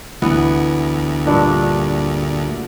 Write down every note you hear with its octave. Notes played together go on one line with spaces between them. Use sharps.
D2 E3 B3
G2 A#2 D4